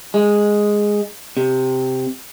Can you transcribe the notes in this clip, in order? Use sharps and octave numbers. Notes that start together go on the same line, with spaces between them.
G#3
C3